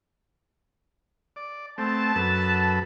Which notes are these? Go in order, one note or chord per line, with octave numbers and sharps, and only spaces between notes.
D5
A3 B3 C4 A5
F#2 A4 B4